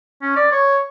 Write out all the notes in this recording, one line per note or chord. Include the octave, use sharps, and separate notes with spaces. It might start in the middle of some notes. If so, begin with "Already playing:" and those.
C#4
D5
C#5